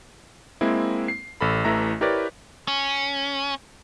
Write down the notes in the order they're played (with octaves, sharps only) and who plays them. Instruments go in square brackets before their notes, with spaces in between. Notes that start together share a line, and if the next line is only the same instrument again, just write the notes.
[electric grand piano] G#3 A#3 C4 E4
C7
A1 A4 B5
A1 E3 A3 E5 A#5 A#6
E4 G4 A#4 B4 C#5 D5
[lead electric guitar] C#4